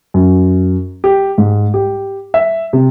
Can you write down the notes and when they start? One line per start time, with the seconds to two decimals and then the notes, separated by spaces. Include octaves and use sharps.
0.14 F#2
1.04 G4
1.38 G#2
1.74 G4
2.34 E5
2.73 C3